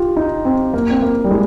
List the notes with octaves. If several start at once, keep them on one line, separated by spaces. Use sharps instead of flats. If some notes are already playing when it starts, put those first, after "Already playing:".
Already playing: F4 G4
D#4
C4
A#3
C4
A#3
G3
G#3